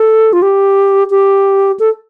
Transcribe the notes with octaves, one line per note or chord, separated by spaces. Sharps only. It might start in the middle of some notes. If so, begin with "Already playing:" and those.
Already playing: A4
F4
G4
G4
A4